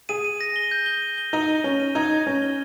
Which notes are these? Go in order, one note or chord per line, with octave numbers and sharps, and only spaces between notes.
G#4 D#7
D#7
A#6
G7
G6
G7
D#7
G7
D#4 D#7
G7
C#4 G7
D#7
D#4 G#6
G#6
C#4 G7
G7